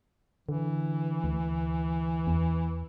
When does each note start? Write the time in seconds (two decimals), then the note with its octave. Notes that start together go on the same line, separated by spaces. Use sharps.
0.49 D3 E3
1.24 D2
2.27 E2